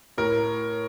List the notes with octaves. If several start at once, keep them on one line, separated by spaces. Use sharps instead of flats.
A2 A#4